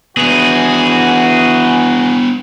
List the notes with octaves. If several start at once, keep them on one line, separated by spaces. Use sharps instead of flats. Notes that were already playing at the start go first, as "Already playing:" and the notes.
E3 B3 D4 F#4 G#4